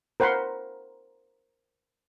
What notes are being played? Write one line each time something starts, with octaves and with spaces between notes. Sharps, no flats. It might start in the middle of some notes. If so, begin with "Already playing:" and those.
A#4 C5 F#5 B5 C6